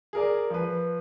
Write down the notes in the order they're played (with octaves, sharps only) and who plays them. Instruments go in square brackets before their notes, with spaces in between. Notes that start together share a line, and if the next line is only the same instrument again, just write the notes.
[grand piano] G#4 A#4 D5
F3 B4